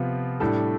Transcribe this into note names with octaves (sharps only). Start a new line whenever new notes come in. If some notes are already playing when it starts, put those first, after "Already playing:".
Already playing: C3 F3 B3 F4
A2 G3 D4 A4